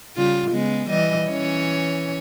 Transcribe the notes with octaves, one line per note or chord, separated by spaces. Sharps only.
C#3 G3 F4
C#3 G#3 B3
E3 G3 D#5
E3 C#4 C#5